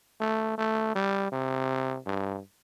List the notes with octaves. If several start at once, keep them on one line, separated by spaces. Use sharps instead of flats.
A3
A3
G3
C3
G2